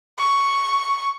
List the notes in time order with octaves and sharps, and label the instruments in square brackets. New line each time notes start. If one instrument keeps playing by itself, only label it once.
[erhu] C#6